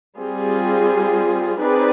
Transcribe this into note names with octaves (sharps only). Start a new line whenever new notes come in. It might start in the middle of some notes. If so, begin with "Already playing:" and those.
G3 C4 F4 G#4
C4 D#4 G#4 B4 D5